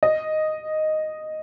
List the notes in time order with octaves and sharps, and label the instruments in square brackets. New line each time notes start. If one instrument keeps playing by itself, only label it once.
[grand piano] D#5